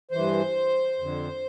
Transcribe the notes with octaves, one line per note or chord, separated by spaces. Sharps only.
G2 E3 C5
F2 D3